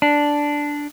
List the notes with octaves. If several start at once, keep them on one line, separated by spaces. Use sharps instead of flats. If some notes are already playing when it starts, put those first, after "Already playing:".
D4